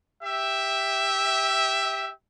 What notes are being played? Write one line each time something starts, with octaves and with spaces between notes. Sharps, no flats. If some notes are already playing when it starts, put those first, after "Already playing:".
G4 E5